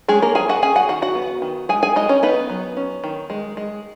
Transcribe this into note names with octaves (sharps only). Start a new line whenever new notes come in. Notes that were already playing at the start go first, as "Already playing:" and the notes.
G#3 C#4 G#4
A#3 A#4
F3 G#4 G#5
F#4 F#5
C#4 G#4 G#5
F#4 F#5
D#3 F#4 F#5
F#4 F#5
B3
D#3
G#3 G#4 G#5
G#4 G#5
G#3 D#4 D#5
C#4 C#5
B3 D#4 B4
F#3
C#4
D#3
G#3
G#3